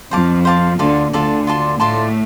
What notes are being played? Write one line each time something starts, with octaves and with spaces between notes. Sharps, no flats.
F2 F3 C5 F5 A5 D6
C5 F5 A5 D6
D2 D3 F4 A4 D5
D2 D3 F4 A4 D5
F4 D5 A5 C6
A2 A3 F4 D5 A5 C6